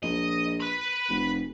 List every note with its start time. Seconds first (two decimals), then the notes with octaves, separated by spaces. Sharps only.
0.03 A#1 D#5
0.60 B4 B5
1.09 F1